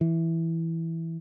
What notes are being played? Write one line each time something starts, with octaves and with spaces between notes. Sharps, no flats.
E3